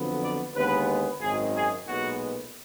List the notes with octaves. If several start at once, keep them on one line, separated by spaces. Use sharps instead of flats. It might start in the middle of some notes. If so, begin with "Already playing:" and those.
Already playing: F2 D3 F#3 B3
D5
D#2 D3 G#3 B3 B4
G#1 F#2 D#3 G#4
G#4
B1 A#2 G#3 B3 F#4